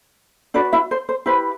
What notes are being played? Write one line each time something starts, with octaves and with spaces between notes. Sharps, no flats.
D4 F#4 B4 D5
E4 E5
C5
C5
E4 G4 B4 C5